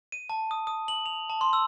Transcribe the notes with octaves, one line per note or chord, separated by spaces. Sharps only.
D#7
A5
D#6
D#6
F#7
F7
A5
C6
E6